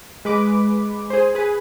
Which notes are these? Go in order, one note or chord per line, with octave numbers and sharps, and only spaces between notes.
G#3 B4 D6
G#4 C5
G#4 B4